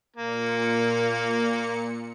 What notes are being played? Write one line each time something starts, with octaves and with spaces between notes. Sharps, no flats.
A#2 A#3 C#7